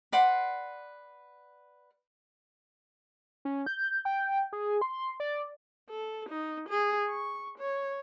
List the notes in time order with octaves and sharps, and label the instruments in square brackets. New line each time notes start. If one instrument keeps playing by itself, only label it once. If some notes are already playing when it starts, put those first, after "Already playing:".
[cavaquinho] B4 D5 F#5 C6
[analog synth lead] C#4
G6
G5
G#4
C6
D5
[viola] A4
D#4
G#4
C#6
C#5